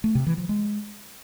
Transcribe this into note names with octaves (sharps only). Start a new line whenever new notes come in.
A3
C3
E3
F3
G#3